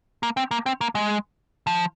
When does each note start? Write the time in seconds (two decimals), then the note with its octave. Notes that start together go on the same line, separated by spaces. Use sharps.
0.23 A#3
0.37 C4
0.51 A#3
0.66 C4
0.81 A#3
0.95 G#3
1.67 F3